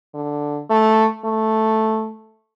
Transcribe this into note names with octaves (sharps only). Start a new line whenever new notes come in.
D3
A3
A3